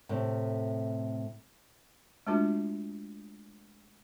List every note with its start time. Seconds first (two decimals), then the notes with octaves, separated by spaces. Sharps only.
0.09 A2 C3
2.27 G#3 A3 D4 F4 F#4